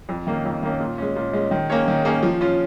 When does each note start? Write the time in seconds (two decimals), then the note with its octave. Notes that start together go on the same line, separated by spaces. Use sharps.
0.09 F2
0.27 D#3 A#3 C#4
0.45 F2
0.63 D#3 A#3 C#4
0.80 A#2
0.98 G#3 C#4
1.16 A#2
1.33 G#3 C#4
1.51 D#3
1.70 A#3 C#4 G#4 C#5
1.88 D#3
2.05 A#3 C#4 G#4 C#5
2.23 F3
2.41 C#4 F4